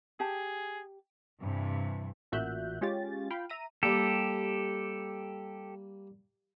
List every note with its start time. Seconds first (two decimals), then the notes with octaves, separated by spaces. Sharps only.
0.20 G4 G#4 A5
1.41 G2 C3 E3
2.32 A1 A#2 F#4 E5 F#6 G6
2.81 G#3 C#4 F4 G4 A6
3.30 F4 F5 G5 B5
3.50 E5 A#5 D#7
3.83 G3 A#3 G4 A4